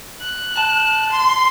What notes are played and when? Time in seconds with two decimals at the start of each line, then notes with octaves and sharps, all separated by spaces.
0.21 F#6
0.57 A5
1.11 C6